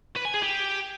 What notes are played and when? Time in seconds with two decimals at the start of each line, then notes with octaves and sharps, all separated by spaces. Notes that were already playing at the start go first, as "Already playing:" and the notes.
0.16 B4
0.25 G#5
0.34 G#4
0.43 G4